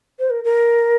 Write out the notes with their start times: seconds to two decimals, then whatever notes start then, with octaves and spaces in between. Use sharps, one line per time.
0.19 C5
0.30 A#4
0.44 A#4